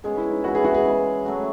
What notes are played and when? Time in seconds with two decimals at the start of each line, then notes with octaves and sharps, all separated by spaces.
0.04 B2 G#3 C#4 G#4
0.17 E4
0.31 D#4
0.44 E3 B3 E4 F#4
0.55 G#4
0.65 F#4
0.74 G#4
0.85 C#3 G#3 B3
1.25 F#3 A3 C#4 F#4